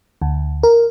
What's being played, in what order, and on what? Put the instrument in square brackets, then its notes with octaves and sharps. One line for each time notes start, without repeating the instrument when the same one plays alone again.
[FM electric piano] D2
A#4